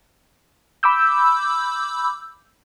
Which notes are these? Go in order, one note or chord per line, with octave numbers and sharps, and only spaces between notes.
B5 D6 E6 G6